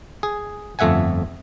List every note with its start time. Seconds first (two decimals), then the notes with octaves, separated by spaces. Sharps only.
0.23 G#4
0.79 G1 F2 A3 E5 F#5 G#5